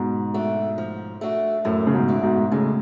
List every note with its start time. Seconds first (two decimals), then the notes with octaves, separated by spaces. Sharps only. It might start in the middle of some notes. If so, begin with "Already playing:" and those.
Already playing: G#2 B2
0.34 A3 D4 F#4
0.78 F3
1.21 A3 D4 F#4
1.65 F#2 A2 F3
1.87 C#3
1.93 G#2 B2
2.08 A3 D4 F#4
2.23 G#2 B2
2.52 A2 C#3 G#3